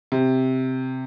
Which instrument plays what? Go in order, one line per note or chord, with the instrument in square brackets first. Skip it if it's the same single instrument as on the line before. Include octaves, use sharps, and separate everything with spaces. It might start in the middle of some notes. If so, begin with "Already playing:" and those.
[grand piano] C3